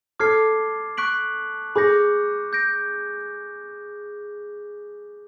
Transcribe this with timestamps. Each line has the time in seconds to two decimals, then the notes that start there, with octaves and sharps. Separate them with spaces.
0.20 A4 D6 F6 G#6 C7
0.97 C#6 F#6 B6 D7 F#7
1.75 G#4 B5 D6 G6 A#6 C#7
2.53 G6 A#6 D7